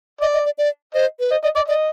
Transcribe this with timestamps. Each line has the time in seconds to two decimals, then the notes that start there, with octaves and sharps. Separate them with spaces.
0.21 D5 D#5
0.34 D#5
0.45 D5
0.58 D5
0.94 C5 D#5
1.20 B4
1.31 C5 D#5
1.43 D5 D#5
1.56 D5 D#5
1.68 D5 D#5